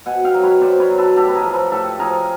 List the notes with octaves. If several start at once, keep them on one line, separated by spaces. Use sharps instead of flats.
B2 F#5 G#5
F5 G5
F#3
B4 C#5
B2 C5 D5
B4 C#5
F#3
A4 B4
A2 G4 A4
B4
G#4 A#4
F3
A4 B4
A2 G4 A4
F3 G#4 A#4